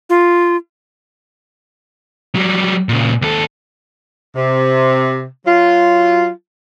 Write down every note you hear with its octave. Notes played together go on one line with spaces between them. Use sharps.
F4
F#3 G3
A#2 C#3
D#2 A4
C3
F#3 F4